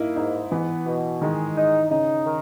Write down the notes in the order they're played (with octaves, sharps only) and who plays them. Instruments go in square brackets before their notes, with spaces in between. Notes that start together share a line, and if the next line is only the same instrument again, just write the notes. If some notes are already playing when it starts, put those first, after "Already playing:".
Already playing: [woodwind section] A#3 [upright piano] D#4 E4
[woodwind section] G#2 [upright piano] D#4
[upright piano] E3 [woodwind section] B3
[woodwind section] B2
[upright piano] D#3 [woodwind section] G#3
[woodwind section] D#4
[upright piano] C#3 [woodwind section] D#4
[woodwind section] D#3